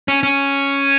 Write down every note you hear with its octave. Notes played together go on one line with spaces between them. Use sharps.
C#4
C#4